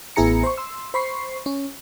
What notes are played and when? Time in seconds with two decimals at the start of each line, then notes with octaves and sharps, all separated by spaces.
0.16 A1 B3 E4 G#4 A#5 C#7
0.43 C5 C#6
0.57 C6 E6
0.94 C5 B5 C#6 C7
1.46 C#4